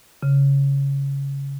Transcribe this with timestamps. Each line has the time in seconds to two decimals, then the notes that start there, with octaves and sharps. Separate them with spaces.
0.23 C#3